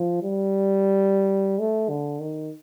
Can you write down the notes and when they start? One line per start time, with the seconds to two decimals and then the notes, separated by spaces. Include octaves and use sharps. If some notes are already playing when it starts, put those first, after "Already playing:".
Already playing: F3
0.23 G3
1.59 A3
1.89 D3
2.20 D#3